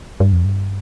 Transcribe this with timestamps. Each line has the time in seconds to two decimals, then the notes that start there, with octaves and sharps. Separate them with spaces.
0.20 G2
0.33 F2
0.45 G2